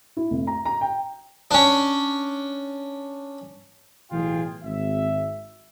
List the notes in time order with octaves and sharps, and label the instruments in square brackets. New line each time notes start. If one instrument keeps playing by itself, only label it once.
[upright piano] E4
F1
A#5
A#5
G5
[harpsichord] C#4 D4
[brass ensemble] B1 A2 E3 F4 G#4 G5
G#1 E5